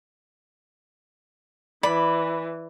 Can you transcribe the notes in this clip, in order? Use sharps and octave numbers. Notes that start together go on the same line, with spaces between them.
E3 D5 B5